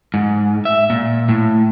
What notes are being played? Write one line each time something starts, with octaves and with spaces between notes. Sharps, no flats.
G#2
E5
A#2
A2